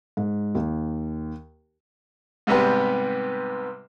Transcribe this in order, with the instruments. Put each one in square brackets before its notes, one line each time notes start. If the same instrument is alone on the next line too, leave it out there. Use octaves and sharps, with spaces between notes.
[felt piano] G#2
D#2
[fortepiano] G#2 C3 G3 B3 G4 B4